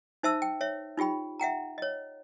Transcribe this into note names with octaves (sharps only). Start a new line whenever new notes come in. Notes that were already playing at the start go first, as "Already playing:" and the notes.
D#4 C5 E5 A5 E6
G5
C#5 E5
D#4 F4 G4 G5 B5
E5 F#5 G5 A#5
C#5 D#5